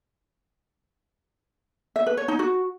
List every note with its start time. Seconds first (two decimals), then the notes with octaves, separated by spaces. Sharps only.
1.96 E5
2.07 B4
2.17 C#5
2.28 D#4
2.39 F#4